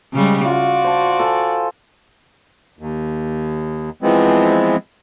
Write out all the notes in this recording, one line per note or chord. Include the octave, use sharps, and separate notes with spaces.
C#3 G3 G#3
F4 F#4 D5
C5 A5
A4 C5 G#5
D#2
E3 F3 G#3 B3 C4